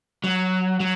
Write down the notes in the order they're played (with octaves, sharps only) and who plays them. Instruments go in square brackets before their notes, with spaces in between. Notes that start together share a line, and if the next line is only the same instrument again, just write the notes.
[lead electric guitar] F#3
F#3